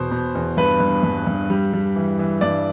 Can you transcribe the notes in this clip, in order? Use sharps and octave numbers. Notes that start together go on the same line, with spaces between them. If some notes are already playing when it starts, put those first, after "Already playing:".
Already playing: E2 B2 C5
B2
E2
G2 B4
G2
G2
G2
G3
G3
E3
E3
G2 D5